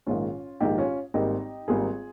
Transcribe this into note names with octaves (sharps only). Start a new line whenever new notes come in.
A#1 G#2 D#3 C#4 F4
A#1 G#2 D#3 D#4 G4
C#4 F4
G#1 G#2 G3 A#3 D#4 G4
G#1 G#2 G3 A#3 F4 G#4